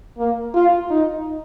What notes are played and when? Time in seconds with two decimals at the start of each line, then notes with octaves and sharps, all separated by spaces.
0.18 A#3
0.54 F4
0.90 D#4